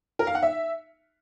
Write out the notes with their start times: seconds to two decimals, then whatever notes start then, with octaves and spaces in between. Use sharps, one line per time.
0.19 A#4
0.27 F5
0.35 F#5
0.43 E5